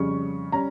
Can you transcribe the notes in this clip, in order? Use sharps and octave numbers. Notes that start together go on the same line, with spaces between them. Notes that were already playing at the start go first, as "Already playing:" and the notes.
Already playing: F2 C#3 G3 C#4 C#6
G3 C#4 A#5